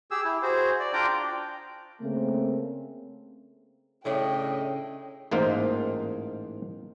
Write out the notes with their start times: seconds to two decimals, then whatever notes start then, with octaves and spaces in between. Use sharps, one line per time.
0.11 G4 G#4 E6
0.25 E4
0.43 F#4 G#4 C5
0.80 D5
0.93 D4 F4 G5 A#5 D6
2.01 C#3 A3 A#3 C4
4.05 A2 C#3 D4 E4 D#5 G5
5.31 A1 G#2 A#3 D#4 F4 C5